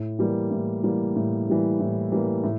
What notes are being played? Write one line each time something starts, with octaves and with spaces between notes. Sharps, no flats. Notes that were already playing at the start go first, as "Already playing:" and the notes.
Already playing: A2
E3 G3 A#3
A2
E3 G3 A#3
A2
E3 G3 A#3
A2
E3 G3 A#3
A2